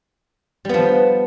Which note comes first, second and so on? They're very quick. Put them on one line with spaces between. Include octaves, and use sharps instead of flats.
G3 B3 F3